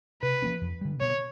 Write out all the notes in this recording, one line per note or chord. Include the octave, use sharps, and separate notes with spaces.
C3 B4
F3 A#3 C#4
F2
D3 G3
B2 C#5